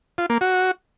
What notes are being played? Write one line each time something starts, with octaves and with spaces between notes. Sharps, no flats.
F4
A#3
F#4